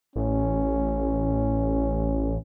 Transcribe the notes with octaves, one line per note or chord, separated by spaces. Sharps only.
A1 C#4